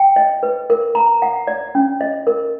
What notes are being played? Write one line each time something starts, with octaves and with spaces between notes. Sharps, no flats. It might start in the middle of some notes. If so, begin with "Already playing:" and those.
Already playing: G5
D#5
B4
A#4
A#5
F#5
D5
C#4
D#5
A#4